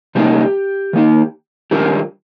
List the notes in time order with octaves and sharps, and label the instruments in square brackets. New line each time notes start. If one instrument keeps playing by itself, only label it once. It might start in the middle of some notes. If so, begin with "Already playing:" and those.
[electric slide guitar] C3 G3 A#3 D#4 G4
D#3 A#3 D#4
D#3 G3 D4 F4 G4 A#4